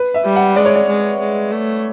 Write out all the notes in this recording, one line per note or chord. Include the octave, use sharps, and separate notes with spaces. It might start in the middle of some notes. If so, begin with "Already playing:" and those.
Already playing: B4
E5
G3
F#5
G#3 D5
C#5
D5
G#3
G#3
A3